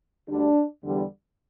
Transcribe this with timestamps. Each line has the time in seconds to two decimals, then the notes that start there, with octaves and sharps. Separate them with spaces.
0.29 D2 D3 G3 D4
0.83 E2 D3 G3